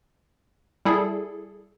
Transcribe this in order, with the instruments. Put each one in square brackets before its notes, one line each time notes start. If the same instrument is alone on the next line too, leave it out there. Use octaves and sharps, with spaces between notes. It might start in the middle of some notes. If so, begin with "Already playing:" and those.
[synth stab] G3 E4 G#4 A4